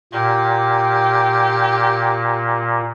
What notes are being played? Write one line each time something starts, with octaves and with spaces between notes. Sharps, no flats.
A#2 G4